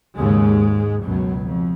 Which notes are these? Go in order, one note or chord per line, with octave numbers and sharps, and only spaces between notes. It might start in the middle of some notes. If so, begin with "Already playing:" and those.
D#2 G#2 C#3 G#3
C#2 F#2 B2 F#3
F2